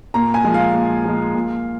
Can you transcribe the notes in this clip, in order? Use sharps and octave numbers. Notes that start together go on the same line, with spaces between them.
A#2 A#5
G#5
F3 G#3
F5
A#2
F3 G#3
A#2